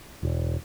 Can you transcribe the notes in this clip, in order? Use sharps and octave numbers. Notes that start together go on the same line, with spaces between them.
E1